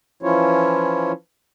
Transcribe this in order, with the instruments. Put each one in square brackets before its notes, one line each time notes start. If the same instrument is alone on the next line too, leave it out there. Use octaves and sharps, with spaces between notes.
[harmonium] E3 F3 C#4 E4 F4 C#5